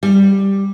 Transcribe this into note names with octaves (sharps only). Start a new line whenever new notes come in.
G3